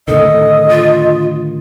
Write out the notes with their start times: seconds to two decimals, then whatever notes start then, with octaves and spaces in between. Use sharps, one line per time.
0.08 A2 D3 D#3 A4 D#5
0.69 F4